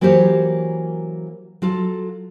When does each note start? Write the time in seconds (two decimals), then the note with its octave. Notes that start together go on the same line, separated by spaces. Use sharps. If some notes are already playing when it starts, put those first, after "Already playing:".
0.01 E3 F#3 A#3 G4 C5 C#5
1.62 F#3 F4 A4